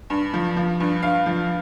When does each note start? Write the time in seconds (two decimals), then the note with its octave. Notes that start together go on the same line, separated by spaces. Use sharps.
0.10 G2
0.33 F3
0.56 F3
0.80 G2
1.02 G2 F5
1.26 F3